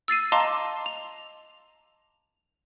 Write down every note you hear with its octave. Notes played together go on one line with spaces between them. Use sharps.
E6 A6 C7 D#7
D#5 F5 A5 A#5 C6 D6
F7